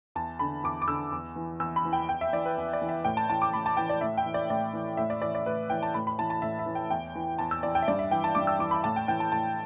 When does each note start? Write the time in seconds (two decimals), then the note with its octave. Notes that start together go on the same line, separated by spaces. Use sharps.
0.15 E2 A5
0.39 D3 B5
0.64 E2 D6
0.82 D6
0.88 D3 E6
1.12 E2
1.36 E3
1.60 E2 E6
1.76 B5
1.85 E3
1.93 G5
2.09 E2 G5
2.21 E5
2.33 E3 D5
2.45 B4
2.57 E2
2.73 D5
2.82 E3
2.89 E5
3.05 A2 G5
3.17 A5
3.29 E3 A5
3.42 D6
3.53 A2 B5
3.66 A5
3.77 E3 G5
3.89 D5
4.01 A2 E5
4.18 G5
4.26 E3
4.34 D5
4.50 A2 D5
4.73 E3
4.97 A2 E5
5.10 D5
5.21 E3 D5
5.35 D5
5.46 A2 B4
5.70 E3 G5
5.83 A5
5.94 A2 B5
6.07 B5
6.19 E3 A5
6.30 A5
6.42 A2 E5
6.59 E5
6.66 E3
6.75 G5
6.90 E2 G5
7.15 E3
7.38 E2 A5
7.51 E6
7.63 E3 D5
7.75 G5
7.83 E5
7.88 G2 D5
7.99 E5
8.11 E3 G5
8.24 A5
8.35 G2 D6
8.47 E6
8.59 E3 D6
8.71 B5
8.84 A2 A5
8.96 G5
9.08 E3 G5
9.20 A5
9.32 A2 A5